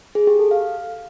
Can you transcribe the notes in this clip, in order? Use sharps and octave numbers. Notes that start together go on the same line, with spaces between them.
G#4
G4
A4
F5